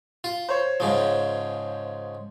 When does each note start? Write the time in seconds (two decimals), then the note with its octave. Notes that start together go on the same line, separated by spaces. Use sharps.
0.24 F4
0.49 C5 C#5
0.80 G#2 C#3 F3